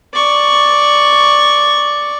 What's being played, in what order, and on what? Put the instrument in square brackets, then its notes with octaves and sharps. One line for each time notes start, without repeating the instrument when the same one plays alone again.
[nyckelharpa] D5 C#6